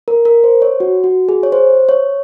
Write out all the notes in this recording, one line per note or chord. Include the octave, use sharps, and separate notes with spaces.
A#4
A#4
C5
C#5
F#4
F#4
G#4
C#5
C5
C#5